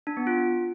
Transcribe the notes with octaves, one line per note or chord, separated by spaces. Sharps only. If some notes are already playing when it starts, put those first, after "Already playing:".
D4
B3
F4